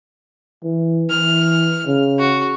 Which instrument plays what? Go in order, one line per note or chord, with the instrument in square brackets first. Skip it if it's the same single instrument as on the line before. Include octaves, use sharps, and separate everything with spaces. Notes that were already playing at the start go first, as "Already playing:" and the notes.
[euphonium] E3
[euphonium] E3 [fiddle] F6
[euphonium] C#3
[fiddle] F#4